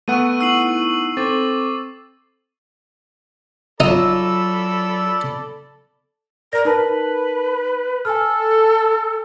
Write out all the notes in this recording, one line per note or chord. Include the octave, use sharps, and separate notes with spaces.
A3 B3 F#5 C#6 E6 D#7
D#4 E4 E6 C7 F#7
C4 A4 D6 A6
F#3 D#4 F4 A4 D5 B5 E6
A#4 D5 A#6
D#4 A#4 B4 A5
A4 G#5 F6